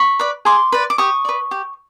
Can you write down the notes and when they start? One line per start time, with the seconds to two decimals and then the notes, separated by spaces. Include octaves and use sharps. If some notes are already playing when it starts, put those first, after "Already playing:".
Already playing: B5 C#6
0.19 B4 D5
0.45 G#4 C6 D6
0.72 B4 D5
0.90 D6
0.98 G4 C#6 D#6
1.25 B4 D5
1.51 G4